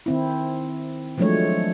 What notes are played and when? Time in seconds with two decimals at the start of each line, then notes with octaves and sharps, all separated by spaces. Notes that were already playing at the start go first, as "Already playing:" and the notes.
0.06 D#3 C4 E4
1.18 F3 F#3 G#3 A3 D4 C#5